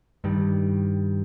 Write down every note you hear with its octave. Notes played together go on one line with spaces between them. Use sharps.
G2 D#3 G3